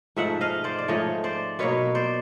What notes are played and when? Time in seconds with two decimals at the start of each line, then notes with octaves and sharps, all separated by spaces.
0.16 G#2 F3 A3 E5 F#5
0.41 D#5 F5
0.64 C5 D5
0.78 D5
0.88 G#2 F3 A3 C#5 D#5
1.24 C5 D5
1.59 B2 F#3 A#3 B4 C#5
1.95 C5 D5